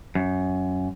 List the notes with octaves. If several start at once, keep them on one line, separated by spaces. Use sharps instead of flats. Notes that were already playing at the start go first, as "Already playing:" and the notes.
F#2